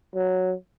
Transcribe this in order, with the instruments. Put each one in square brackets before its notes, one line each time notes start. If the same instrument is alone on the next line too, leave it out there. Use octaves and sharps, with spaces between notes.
[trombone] F#3